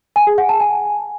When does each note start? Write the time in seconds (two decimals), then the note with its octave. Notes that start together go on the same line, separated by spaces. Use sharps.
0.16 G#5
0.27 G#4
0.38 F#5
0.49 A5
0.60 G#5